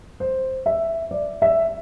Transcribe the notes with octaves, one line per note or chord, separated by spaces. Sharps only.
C5
E5
D5
E5